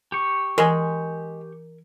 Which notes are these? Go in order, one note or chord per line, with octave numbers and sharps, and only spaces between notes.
G4 C#6
E3 G#3 A#4 G#5 C6 A#6